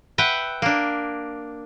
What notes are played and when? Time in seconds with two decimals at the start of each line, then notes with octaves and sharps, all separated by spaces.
0.18 B4 E5 F#5 G5
0.62 A#3 D4